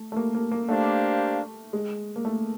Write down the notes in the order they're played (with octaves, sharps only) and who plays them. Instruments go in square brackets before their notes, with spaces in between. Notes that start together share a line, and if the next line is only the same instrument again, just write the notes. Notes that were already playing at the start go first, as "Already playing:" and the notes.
Already playing: [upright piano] A3
A3
A#3
A#3
A#3
[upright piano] A3 [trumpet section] A#3 D4 G4 C5 F5
[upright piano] G#3
A#3
A3